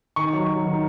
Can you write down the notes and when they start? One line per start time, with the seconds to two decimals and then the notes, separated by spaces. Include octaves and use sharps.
0.16 D#3 C#6
0.33 F#3
0.49 F#3
0.66 D#3